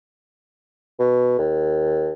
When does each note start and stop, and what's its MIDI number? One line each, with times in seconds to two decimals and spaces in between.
1.00 1.38 47
1.38 2.13 39